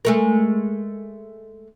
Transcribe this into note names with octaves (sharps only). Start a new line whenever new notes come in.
G#3 A3 A#4